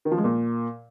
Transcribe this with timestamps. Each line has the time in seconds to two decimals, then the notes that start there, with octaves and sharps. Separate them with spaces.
0.05 D#3
0.12 F3
0.18 G#3
0.24 A#2